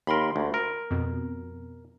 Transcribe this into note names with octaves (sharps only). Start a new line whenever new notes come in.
D#2 A#4 B5 C6
D2
A#4
F2 B2